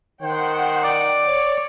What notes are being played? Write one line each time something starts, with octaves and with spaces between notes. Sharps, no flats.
D#3 C5 F#5 G5
D5 D6
C#5